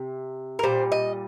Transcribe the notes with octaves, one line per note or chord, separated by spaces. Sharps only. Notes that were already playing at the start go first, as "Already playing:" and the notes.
Already playing: C3
A#4
A#2 G3 C5
D#5